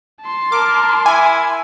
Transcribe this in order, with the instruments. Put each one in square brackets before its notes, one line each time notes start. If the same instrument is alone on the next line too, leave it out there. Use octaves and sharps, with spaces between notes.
[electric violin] A5 C6
[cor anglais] A#4 [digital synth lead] D6
[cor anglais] E4 [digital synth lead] G#5